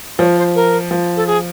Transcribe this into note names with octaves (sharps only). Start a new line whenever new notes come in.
F3 C#5
C5
A#4
F3
A4
G#4